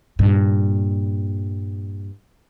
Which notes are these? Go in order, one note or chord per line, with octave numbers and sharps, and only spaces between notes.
G2 A#2